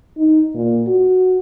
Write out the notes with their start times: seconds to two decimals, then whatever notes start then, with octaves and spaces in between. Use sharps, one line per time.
0.17 D#4
0.54 A#2
0.87 F#4